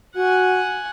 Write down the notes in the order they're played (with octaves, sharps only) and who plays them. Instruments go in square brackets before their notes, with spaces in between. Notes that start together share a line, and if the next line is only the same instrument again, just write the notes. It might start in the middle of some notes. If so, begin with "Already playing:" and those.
[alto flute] F#4 [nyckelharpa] F#5 G#5